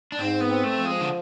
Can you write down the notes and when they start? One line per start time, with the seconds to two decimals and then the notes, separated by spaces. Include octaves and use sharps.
0.12 D4
0.19 G#2 C4
0.41 B3
0.48 C4
0.64 A3
0.78 F3
0.85 G#3
1.01 D3